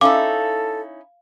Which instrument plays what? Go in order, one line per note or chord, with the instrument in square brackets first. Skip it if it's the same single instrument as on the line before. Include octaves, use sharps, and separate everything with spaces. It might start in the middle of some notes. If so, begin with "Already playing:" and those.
[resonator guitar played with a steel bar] C#4 D#4 E4 [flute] A4 [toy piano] F5 [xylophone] D6